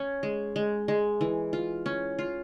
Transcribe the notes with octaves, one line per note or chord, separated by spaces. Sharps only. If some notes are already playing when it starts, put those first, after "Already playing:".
Already playing: C#4
G#3
G#3
G#3
E3
F4
C#4
F4